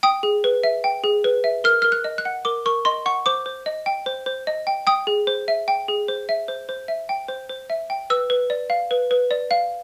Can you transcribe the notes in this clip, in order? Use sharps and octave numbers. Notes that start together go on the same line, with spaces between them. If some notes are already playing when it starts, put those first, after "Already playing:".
G5 D#6
G#4
B4
E5
G5
G#4
B4
E5
A#4 F6
A#4 F6
F#6
D#5
F#6
F#5
A#4 D6
A#4 C#6
D#5 C6
F#5 C#6
C5 D6
C5
D#5
G5
C5
C5
D#5
G5
G5 D#6
G#4
C5
E5
G5
G#4
C5
E5
C5
C5
E5
G5
C5
C5
E5
G5
B4 E6
B4
D5
F5
B4
B4
D5
F5